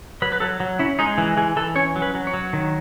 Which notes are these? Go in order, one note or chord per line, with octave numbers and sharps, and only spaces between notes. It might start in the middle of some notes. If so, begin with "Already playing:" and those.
F#3 B4
B4
F#3 A4
F#3
C#4 E4
G#3 D#4
E3
E3 G#4
E3 A4
C#4 C#5
F#3
B4
F#3
C#5
F#3
D#3